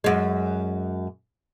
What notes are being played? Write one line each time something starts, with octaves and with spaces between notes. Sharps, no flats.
F#2 G#3